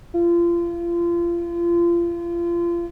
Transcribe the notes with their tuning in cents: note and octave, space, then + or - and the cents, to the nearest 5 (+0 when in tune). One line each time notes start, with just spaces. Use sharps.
F4 -30